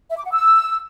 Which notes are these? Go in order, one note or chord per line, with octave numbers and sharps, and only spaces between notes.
E5
D6
F#5
E6